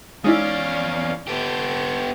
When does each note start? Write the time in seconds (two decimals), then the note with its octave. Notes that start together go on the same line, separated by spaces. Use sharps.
0.24 E2 G#3 C#4 D#4 E4 D5 F5
1.27 B3 G4 A4 G6